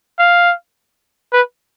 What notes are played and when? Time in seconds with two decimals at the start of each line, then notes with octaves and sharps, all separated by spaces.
0.18 F5
1.33 B4